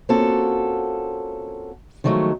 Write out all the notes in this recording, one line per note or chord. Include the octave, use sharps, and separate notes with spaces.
A#3 C4 C#4 F4 F#4 A4
D#3 F3 F#3 G#3 A3